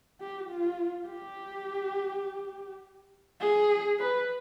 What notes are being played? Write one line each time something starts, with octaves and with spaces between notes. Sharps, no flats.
G4
F4
G4
G#4
B4